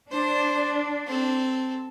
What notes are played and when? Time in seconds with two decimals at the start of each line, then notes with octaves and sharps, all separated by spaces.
0.11 D4 C5
1.07 C4 A4